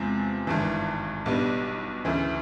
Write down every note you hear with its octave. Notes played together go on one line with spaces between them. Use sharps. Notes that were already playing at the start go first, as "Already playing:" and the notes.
Already playing: E2 C3 F3 G#3 C4
G#1 G2 E3
B1 B2 G3 B3 D4
D2 C#3 E3